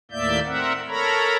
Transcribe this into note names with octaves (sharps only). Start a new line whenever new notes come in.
D#2 A2 A#3 D5 E5 G6
C4 A#4 E5 F#5
A4 A#4 C#5 A#5 B5